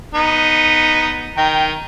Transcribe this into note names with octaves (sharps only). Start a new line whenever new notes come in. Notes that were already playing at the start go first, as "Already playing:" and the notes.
B3 D#4
D#3 G5 A#5